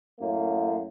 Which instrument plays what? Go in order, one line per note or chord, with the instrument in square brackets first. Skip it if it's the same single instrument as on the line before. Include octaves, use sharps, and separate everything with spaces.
[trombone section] F#2 A2 A#3